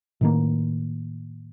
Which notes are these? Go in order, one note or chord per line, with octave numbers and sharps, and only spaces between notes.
A2 D#3 A#3